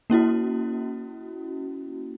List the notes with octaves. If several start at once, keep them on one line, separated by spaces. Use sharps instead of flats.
A#3 C#4 E4 F#4